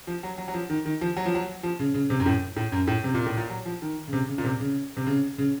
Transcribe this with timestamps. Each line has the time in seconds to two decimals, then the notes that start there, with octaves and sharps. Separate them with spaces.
0.07 F3
0.23 F#3
0.38 F#3
0.48 F#3
0.54 F3
0.70 D#3
0.86 D#3
1.01 F3
1.17 F#3
1.26 F3
1.35 F#3
1.63 F3
1.79 C#3
1.94 C#3
2.10 C3
2.20 F#2
2.26 A2
2.56 A2
2.72 F#2
2.87 A2
3.04 C3
3.14 A#2
3.26 A2
3.37 A#2
3.50 F#3
3.65 F3
3.82 D#3
4.08 C#3
4.13 C3
4.28 C#3
4.38 A#2
4.44 C3
4.60 C#3
4.97 C3
5.07 C#3
5.38 C#3